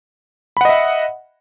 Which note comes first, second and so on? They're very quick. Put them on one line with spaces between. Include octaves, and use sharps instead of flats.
B5 F#5 D#5 E5